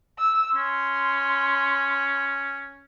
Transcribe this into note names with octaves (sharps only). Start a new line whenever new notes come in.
E6
C#4 C6